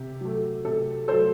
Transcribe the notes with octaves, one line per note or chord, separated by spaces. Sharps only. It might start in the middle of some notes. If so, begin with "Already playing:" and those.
Already playing: C3 G4
F#3 A3
C3 A4
F#3 A3 A4 C5